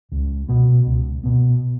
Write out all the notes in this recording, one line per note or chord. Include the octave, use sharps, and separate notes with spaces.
C#2
B2 B3
C#2
B2 B3